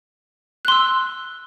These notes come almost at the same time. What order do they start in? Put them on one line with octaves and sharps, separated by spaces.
F#6 C6 E6